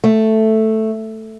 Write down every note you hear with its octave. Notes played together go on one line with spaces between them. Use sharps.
A3